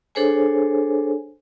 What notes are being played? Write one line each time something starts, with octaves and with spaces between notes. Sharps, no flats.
D4 G#4 A4 C5 C#5 G#5